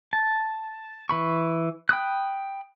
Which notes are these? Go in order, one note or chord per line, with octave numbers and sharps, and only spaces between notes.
A5
E3 B5 C#6
G5 B5 D#6 F#6